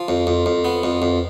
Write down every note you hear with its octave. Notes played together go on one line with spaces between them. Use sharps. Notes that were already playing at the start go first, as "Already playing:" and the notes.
Already playing: F3
F2
F2
F2
B3
F2
F2